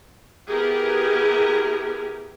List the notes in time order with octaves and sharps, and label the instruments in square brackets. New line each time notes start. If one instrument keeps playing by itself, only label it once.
[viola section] B3 E4 G4 G#4 A#4